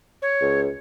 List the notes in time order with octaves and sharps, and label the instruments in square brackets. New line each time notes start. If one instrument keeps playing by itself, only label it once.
[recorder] C#5
[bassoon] C#2